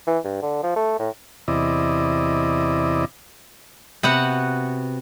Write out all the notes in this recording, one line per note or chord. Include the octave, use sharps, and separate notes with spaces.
E3
G2
D3
F3
A3
A2
E2 C3 E4 D5 D#5
C3 B3 F#4 F#5